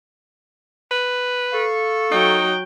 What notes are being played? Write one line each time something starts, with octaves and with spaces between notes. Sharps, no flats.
B4
A4 F5 C#6
F#3 D#4 G5